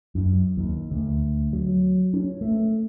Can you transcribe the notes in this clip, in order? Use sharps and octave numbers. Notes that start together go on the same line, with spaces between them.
F#2
D#2
D2
F#3
C#4
A3